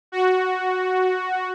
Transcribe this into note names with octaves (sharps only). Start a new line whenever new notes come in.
F#4